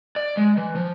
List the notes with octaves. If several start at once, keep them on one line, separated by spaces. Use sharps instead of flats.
D5
G#3
E3
F3